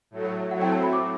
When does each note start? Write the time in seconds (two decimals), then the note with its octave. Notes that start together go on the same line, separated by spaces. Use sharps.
0.11 A2 F#3 A3
0.51 F#3 A3 C4 E4 F#5
0.62 G5
0.72 A5
0.83 B5
0.93 D6